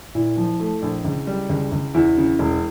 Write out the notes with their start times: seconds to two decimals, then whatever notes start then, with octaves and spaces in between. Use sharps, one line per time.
0.15 A#2 E4
0.37 F3
0.60 A3
0.82 A#1
1.04 C#2
1.27 G3
1.50 C#2
1.72 C#2
1.94 E2 E4
2.17 C#3
2.39 E1